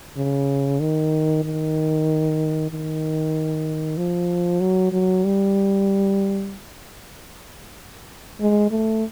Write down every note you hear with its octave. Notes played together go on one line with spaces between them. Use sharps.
C#3
D#3
D#3
D#3
F3
F#3
F#3
G3
G#3
A3